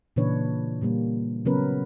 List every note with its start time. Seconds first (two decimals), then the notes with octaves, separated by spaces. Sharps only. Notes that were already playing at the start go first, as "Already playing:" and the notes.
0.16 A#2 C#3 E3 D4 B4 C#5
0.82 A#2 G3 A#3
1.45 C#3 F#3 B3 C#4 A#4 B4